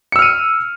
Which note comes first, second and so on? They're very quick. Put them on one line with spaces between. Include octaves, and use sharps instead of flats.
C#7 E6 F6 D#7